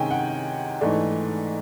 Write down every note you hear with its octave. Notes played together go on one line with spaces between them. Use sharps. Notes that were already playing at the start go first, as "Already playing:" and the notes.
Already playing: C3 D#3 G#3 C#4 G5 G#5
F#5
G#2 E3 A3 D4